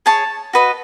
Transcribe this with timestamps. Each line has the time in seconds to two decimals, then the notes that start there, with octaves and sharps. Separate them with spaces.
0.06 G#4 C#5 A5
0.53 F#4 B4 D#5